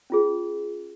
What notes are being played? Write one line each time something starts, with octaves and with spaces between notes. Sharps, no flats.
C#4 F4 G#4